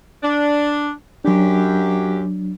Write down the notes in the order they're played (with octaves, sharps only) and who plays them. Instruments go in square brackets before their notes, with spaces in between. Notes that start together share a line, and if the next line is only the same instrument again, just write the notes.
[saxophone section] D4
[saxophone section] F#2 G4 [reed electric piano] F#3 D4